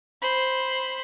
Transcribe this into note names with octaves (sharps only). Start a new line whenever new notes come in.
C5 B5